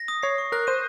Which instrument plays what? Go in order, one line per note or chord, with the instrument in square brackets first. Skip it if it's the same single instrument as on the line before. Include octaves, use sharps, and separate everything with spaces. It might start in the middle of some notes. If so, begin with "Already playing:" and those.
Already playing: [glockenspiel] A#6
D#6
[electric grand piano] C#5 [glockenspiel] C7
[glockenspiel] C#6
[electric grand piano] A#4 [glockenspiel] F#6
[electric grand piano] C5 [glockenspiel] D#7